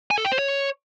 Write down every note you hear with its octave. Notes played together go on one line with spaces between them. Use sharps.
G#5
A4
G5
C5
C#5